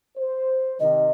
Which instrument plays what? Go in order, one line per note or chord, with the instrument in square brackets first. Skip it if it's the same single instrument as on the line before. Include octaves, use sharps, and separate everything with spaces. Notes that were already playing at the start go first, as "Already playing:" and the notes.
[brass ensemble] C5
[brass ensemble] C3 D#3 [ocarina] D#5